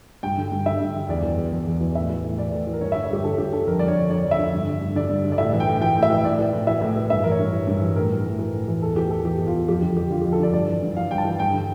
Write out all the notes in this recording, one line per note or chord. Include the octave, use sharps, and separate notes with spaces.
G2 G5
D3
G2
D3 E5
G2
D3
E2 D5
E3
E2
E3
E2
E3
A2 E5
E3
A2
E3 D5
A2
E3
A#4
G2 C#5
D3 E5
C#5
G2 G4
D3 A4
G2 G4
D3 A4
F2 A#4
D3 D5
C#5
F2
D3 D5
F2
E5
D3
G2
D3
G2
D3 D5
G2
D3
D5
A2 E5
E3
G5
A2
E3 G5
A2
E5
E3
A2 D5
E3
A2
E3 E5
A2
E3
G2 E5
E3 A#4
C#5
G2
E3
G2
E3
A2 A#4
E3
A2
E3
A2
E3
E2 A4
E3 G4
E2 A4
E3 G4
E2
F4
E3
F2 G4
D3
F2 G4
D3 F4
F2 G4
A4
D3 D5
G2 D5
E3
G2
E3 F5
G2 G5
A5
E3
G2 G5
D3